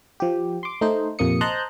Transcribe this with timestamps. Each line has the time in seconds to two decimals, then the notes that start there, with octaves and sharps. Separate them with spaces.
0.20 F3 G4
0.63 C6 D6
0.81 A3 D#4 C5
1.19 A#1 F2 C3 A#3 D#6 C#7
1.41 C5 D#5 A5 A#5 F#6 G6